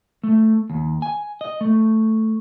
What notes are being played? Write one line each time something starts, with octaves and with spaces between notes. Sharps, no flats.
A3
D#2
G#5
D#5
A3